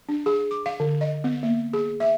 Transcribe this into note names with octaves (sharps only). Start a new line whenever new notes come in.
D4
G#4
D6
F5
D3
D#5
B3
A#3
G#4
E5